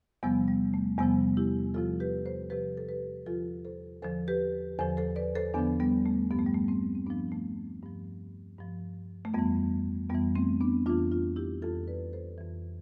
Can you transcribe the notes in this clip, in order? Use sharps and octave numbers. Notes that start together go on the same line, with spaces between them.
E2 C3 F3 G3 B3
G3
A3
E2 C3 F3 G3 B3
E4 G4
E2 C3 F3 F4 A4
G4 B4
A4 C5
E2 C3 F3 G4 B4
A4
G4 B4
E2 D3 F3 F4 A4
A4 C5
E2 D3 F3 A4 C5
G4 B4
E2 D3 F3 A4 C5
A4 C5
B4 D5
A4 C5
E2 D3 F3 B3 D4
G3 B3
A3
G2 F3 B3
A3
G3
A3
A3 C4
C4
G2 F3 B3 D4
A3
G2 F3
G2 F3
A3
F2 E3 G3 B3
F2 E3 G3 B3
A3 C4
B3 D4
F2 E3 D4 F4
D4 F4
E4 G4
F2 E3 F4 A4
B4 D5
A4 C5
F2 E3